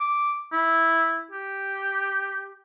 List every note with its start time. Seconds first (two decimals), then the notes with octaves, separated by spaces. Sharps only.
0.01 D6
0.53 E4
1.31 G4